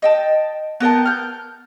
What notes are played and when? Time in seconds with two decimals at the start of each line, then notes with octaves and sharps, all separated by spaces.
0.02 D#5 G5 A5
0.80 B3 A#4 G5 A5
1.05 F6 G6